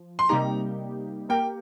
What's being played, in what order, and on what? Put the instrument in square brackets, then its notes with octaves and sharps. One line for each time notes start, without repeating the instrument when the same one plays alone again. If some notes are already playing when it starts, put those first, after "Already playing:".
Already playing: [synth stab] F3
[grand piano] C6
[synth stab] C3 G3 A#3 D#4 G4 [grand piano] A#5
[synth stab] A#3 G4 A#4 [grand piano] G5